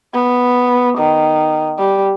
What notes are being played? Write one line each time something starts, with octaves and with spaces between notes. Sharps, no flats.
B3
D#3
G3